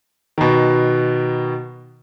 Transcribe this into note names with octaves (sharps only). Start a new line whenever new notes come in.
B2 D#3